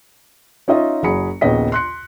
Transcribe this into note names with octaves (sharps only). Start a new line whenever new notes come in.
C#4 D#4 F4 D#5 E5
F#1 F#3 G#4 B5 C#7
A#1 D#2 C#3 B3 D#5 B6
C6 F#6 C#7